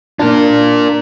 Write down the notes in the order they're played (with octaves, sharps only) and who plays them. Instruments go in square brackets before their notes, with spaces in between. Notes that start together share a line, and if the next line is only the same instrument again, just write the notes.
[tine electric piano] A#3 D4 [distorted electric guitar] F4 A#4